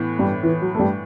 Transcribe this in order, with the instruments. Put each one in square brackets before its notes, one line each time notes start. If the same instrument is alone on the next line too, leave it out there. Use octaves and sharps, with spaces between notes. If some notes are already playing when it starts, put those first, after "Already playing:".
Already playing: [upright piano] A2 E3 B3
[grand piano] G2 G3
E3
F#3
A3
G2 G3